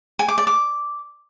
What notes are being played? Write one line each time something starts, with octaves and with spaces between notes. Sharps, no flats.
G#5
D6
D5
D6